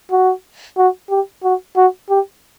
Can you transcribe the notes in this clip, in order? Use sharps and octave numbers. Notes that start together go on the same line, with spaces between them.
F#4
F#4
G4
F#4
F#4
G4